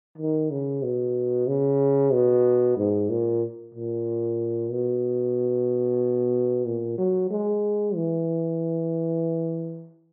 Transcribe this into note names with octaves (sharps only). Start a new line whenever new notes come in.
D#3
C#3
B2
C#3
B2
G#2
A#2
A#2
B2
A#2
F#3
G#3
E3